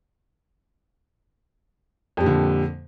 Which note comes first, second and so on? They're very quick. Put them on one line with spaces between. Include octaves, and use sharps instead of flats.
F2 G3 A#2 D3